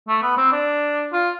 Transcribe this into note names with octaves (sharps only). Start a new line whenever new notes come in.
A3
B3
C4
D4
F4